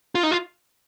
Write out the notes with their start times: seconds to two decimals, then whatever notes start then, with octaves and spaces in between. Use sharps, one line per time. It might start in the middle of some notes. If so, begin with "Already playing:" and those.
0.15 F4
0.23 D#4
0.31 F4